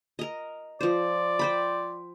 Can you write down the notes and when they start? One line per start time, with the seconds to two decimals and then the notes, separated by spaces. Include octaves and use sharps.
0.19 A#4 D#5
0.81 F3 C5 D5
1.39 C5 G5 B5